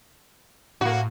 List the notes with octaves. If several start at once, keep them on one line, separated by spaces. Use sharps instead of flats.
A2 A#3 F#4